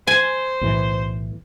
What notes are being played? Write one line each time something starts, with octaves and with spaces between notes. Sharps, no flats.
C5 G#5
B1 A2 E3